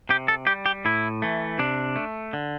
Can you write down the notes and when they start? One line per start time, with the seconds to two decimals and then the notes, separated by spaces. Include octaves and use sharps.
0.09 C3 G4
0.28 A4
0.47 G3 G4
0.66 G4
0.85 A2 E4
1.22 E3 A3
1.59 C3 D4
1.96 A3
2.33 D3